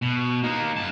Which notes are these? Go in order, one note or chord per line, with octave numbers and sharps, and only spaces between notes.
B2
A#3 D#4
F#2 A5